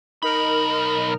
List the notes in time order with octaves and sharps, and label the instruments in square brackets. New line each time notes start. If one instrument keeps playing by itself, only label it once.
[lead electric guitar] B1 B5 [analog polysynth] D#4 A#4 F6